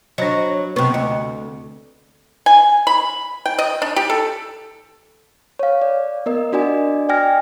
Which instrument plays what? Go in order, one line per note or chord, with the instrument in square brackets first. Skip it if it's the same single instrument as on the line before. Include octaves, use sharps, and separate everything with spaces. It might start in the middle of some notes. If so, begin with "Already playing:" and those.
[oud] F#3 [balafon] D4 C5 D#5
[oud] C3 B3 [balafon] C#6
[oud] D2 [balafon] D#5
[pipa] G#5
B5
G5
D#5
D4
G4
A4
[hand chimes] C#5 F5
D5
B3 A#4 D#5
D4 F#4 D5 D#5 G#5
D5 D#5 G5 G#5 F6 A#6